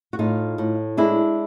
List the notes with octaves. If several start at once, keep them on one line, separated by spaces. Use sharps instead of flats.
F#4
A2 D#4 F4
A2
G#3 D4 E4